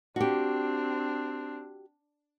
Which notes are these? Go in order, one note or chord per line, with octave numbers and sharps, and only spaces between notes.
C4 D4 F#4 G4